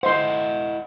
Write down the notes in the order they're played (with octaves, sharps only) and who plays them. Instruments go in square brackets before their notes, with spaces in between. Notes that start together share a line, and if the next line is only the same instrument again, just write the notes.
[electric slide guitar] E4 D#5 F#5 [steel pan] C5 C6